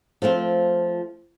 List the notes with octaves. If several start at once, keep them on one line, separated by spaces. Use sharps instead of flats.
F3 A3 C4 F4